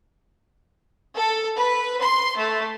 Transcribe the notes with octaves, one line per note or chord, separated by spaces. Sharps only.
A4
B4
C6
A3